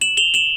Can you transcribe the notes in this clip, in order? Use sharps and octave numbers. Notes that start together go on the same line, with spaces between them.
E7 F#7
F7 G7
E7 F#7